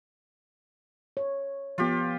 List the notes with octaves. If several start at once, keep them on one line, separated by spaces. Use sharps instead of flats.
C#5
F3 B3 F4 G4